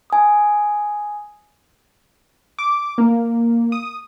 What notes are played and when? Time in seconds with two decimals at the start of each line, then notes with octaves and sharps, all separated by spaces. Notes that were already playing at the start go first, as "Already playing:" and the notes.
0.10 G#5 D#6
2.59 D6
2.98 A#3
3.72 D#6